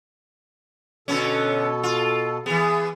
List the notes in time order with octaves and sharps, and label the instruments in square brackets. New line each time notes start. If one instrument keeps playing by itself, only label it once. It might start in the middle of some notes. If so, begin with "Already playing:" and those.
[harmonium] B2 A4 [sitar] D3 B3 C#4
[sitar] F4
[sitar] E3 B3 [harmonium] G#4